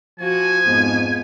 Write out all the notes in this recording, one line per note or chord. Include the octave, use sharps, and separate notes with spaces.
F3 F#4 G#5
F2 G#2 B3